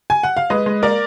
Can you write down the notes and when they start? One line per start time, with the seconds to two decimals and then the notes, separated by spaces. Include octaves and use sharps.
0.10 G#5
0.23 F#5
0.37 F5
0.50 G#3 B4 D#5
0.66 G#3
0.82 A#3 A#4 D5